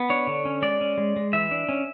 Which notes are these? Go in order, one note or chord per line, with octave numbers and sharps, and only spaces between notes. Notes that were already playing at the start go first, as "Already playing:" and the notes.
Already playing: B3
D4 C#5
D3
C#4
G#3 D5
C#4
G#3
G#3
E3 E5
D4
C#4